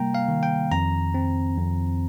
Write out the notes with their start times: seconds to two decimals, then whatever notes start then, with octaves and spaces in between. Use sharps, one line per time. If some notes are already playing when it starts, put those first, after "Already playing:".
Already playing: C3 G3 A#3 G5 A#5
0.14 F5
0.29 D#3
0.43 G5
0.71 F2 A#5
1.14 C4
1.57 F2